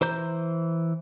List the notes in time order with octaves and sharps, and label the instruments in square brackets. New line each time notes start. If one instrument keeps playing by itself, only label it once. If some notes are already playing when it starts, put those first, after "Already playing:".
[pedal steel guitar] E3 C5 A#5 G6